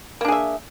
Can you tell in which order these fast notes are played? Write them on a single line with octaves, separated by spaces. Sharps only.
A#3 D4 G#4 E5